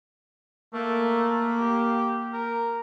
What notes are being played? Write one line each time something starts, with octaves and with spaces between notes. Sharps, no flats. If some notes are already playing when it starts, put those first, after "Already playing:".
A3 A#3
G4
A#4